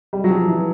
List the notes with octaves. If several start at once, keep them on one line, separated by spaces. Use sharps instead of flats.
G3
F#3
F3
E3